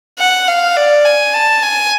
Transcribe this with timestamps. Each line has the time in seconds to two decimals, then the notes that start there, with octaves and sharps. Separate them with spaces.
0.19 F#5
0.48 F5
0.77 D5
1.06 G#5
1.34 A5
1.63 G#5